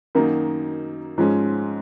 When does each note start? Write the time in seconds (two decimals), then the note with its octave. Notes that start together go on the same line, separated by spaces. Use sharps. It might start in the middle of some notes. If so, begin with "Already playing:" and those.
0.15 F#2 D#3 F#3 A#3 D#4
1.18 G#2 F3 G#3 C#4